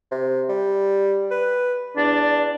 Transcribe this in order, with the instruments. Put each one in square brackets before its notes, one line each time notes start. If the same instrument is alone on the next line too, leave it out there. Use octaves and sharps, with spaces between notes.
[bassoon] C3
G3
B4
[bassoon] E2 [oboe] D4